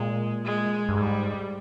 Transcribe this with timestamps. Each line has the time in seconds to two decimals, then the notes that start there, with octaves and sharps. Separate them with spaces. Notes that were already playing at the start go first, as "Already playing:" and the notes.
Already playing: A#2 G#3
0.45 G#3
0.89 G2
0.97 G#2 G3